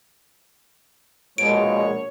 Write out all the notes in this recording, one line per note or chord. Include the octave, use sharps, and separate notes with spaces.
A#1 B2 G#3 C#5 D7